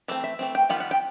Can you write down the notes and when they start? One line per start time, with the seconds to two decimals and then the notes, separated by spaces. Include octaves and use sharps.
0.08 E3 A3 C4
0.24 E5
0.39 E3 A3 C4
0.55 G5
0.69 D#3 G3 B3 F4 F#5
0.80 F#5
0.91 G5